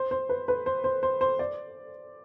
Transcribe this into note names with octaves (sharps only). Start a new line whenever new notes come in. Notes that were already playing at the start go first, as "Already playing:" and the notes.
Already playing: C5
C5
B4
B4
C5
C5
C5
C5
D5